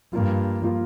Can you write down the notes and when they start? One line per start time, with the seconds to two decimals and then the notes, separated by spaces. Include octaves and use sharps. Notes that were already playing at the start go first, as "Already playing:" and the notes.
0.13 G2 F3 A#3 F4
0.62 F3 A#3 F4